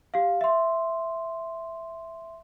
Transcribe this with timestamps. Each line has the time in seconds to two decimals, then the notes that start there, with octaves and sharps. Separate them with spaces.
0.14 G4 F5
0.41 E5 C6